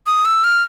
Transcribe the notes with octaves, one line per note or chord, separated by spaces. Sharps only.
D#6
E6
F6